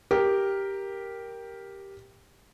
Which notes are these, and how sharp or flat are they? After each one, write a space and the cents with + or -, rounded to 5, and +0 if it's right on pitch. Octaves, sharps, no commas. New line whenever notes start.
G4 +0 A#4 +0